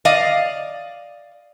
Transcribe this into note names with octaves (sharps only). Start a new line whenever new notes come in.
D5 D#5 F5